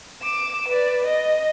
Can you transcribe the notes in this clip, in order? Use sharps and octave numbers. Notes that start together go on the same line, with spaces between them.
D6 E7
B4 D5
D#5